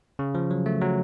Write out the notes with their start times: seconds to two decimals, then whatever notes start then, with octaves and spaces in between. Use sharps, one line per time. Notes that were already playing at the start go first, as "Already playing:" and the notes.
0.19 C#3
0.35 F3
0.51 F#3
0.66 A3
0.82 F#3